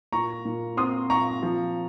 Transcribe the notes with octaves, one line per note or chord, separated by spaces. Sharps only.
A#2 A#5 C#6
A#2
C4 C6 D#6
A#2 A#5 C#6
F3